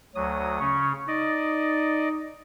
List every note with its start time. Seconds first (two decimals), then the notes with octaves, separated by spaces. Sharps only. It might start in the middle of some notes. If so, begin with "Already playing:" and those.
0.15 D2 F#3 C#5 D#6
0.60 C#3 C#4 C#6
1.08 D#4 D5 D#5